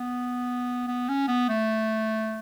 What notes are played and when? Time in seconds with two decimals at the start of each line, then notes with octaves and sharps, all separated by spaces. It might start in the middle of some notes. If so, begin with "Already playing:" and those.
Already playing: B3
0.87 B3
1.09 C#4
1.28 B3
1.49 A3